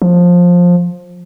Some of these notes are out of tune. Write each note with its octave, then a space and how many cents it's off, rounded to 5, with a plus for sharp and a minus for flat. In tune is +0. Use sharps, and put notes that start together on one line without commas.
F3 +15